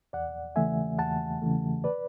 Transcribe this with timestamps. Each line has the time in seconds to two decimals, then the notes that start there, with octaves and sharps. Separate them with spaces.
0.13 E2 D5 F#5
0.56 C#3 E3 A3 E5 G#5
0.98 E2 F#5 A5
1.42 C#3 E3 A3
1.84 B4 D5